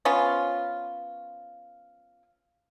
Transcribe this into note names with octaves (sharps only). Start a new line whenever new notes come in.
F3 B3 C#4 F4